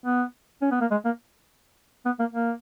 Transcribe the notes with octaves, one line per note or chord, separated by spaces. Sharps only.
B3
C#4
B3
A#3
G#3
A#3
B3
A#3
A#3